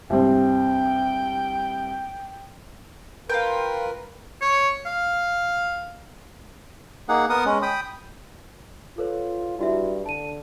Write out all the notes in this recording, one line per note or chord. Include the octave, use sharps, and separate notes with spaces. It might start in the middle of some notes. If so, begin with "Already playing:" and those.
C2 G2 C4 G5
F4 A#4 B4 G5
C#5
F5
A#3 D#4 G#4 F#5
B3 A#4 F#5 D#6
G#3 C#4
G5 B5 D#6
F4 A4 B4 C#5
G2 E4 F#4 E5
D3 A5 D#7